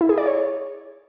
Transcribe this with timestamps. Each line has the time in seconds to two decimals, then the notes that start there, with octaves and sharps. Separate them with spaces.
0.01 E4
0.09 G#4
0.18 D5
0.26 C#5